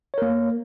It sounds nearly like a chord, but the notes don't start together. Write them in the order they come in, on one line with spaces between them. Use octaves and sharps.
C#5 A#4 A#3